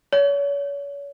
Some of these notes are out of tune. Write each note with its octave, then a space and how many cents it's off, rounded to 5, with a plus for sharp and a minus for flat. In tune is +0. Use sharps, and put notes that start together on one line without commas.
C#5 +35